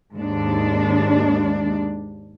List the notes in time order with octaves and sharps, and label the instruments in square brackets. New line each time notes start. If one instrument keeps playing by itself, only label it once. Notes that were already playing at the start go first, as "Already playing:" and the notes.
[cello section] D#2 G#2 D4